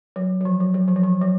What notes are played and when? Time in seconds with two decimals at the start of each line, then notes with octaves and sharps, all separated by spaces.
0.16 F#3
0.41 F#3
0.45 F3
0.60 F#3
0.74 F#3
0.88 F3
0.96 F#3
1.03 F3
1.21 F#3